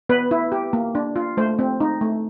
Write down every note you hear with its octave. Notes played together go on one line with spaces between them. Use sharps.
B3 B4
E4
G4
A#3
D4
F4
A3 C5
C4
D#4
A3